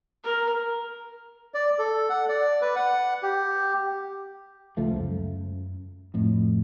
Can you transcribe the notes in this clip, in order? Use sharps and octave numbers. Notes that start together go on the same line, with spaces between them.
A#4
D5
A4
F#5
D5
B4
F#5
G4
C#2 F3 A3
F#2
F2 A2